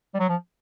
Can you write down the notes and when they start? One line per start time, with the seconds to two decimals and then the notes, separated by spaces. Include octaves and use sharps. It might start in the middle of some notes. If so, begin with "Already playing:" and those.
0.14 G3
0.19 F#3
0.29 F3